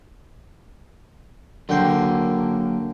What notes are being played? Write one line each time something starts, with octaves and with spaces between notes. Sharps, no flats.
D3 F#3 A#3 G5 C6